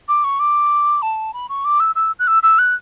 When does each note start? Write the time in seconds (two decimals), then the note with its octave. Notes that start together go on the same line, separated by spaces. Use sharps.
0.08 D6
0.24 C#6
0.40 D6
1.02 A5
1.34 B5
1.49 C#6
1.65 D6
1.80 E6
1.96 E6
2.19 F#6
2.27 E6
2.43 E6
2.59 F#6